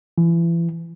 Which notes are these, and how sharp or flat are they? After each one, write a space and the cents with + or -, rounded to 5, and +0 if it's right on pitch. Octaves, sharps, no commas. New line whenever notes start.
E3 +35